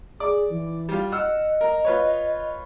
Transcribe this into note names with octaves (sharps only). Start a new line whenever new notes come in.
G#4 D5
E3
G3 F4
D#5 F#5 E6 F6
A#4
F4 B4 C#5